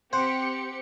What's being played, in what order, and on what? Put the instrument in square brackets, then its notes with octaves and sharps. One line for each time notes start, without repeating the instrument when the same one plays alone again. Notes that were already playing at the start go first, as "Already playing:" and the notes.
[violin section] C4 G4 C#7 [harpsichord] C5 F#5